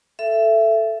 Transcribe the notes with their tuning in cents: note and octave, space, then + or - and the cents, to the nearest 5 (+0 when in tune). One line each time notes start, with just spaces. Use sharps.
A4 +0 E5 +20